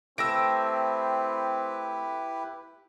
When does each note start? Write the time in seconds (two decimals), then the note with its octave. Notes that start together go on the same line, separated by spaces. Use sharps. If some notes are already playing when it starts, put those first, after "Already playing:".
0.18 A3 C4 E4 G4 B4 E6 A#6 D7